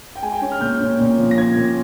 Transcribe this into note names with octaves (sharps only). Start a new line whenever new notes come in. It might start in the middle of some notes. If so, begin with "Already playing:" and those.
G5
G#3 G#5
G5
C#4
F6
A#2 G6
C#4
A#2
F3
A#6
C#4 G#6
A#2